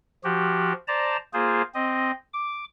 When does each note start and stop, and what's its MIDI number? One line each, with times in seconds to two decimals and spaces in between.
0.24 0.73 53
0.24 0.73 66
0.24 0.73 67
0.88 1.17 72
0.88 1.17 74
0.88 1.17 81
0.88 1.17 82
1.33 1.62 58
1.33 1.62 65
1.33 1.62 68
1.33 1.62 72
1.74 2.11 60
1.74 2.11 75
2.34 2.65 86